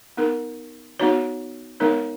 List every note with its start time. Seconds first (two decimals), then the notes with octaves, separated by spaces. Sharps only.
0.17 B3 D#4 A#4
1.00 B3 D#4 F#4 C#5
1.80 G#3 B3 D#4 A#4 C#5